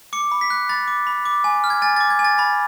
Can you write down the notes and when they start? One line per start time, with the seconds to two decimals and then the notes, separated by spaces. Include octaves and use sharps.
0.13 D6 C#7
0.32 B5
0.41 B6
0.50 F#6
0.69 B5 A6
0.88 D6
1.07 B5
1.25 D6
1.44 G#5
1.64 F6
1.70 G#6
1.82 G#5 A6
1.96 D6 A6
2.10 G#6
2.19 G#5
2.24 A6
2.38 B5 A6